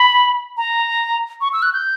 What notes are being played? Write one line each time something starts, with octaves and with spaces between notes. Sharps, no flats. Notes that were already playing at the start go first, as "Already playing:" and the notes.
Already playing: B5
A#5
C#6
E6
F#6
G6